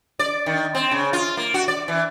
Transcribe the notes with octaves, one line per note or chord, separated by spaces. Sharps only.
D5
D#3
C4
C#3
F4
A#3
F#4
D5
E3